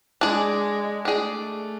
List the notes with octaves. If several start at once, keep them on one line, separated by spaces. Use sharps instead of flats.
G#3 D4 G#4 D5
A3 D4 G#4 D5